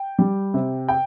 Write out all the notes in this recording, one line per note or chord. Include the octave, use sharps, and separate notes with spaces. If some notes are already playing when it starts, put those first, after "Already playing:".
Already playing: G5
G3
C3
G5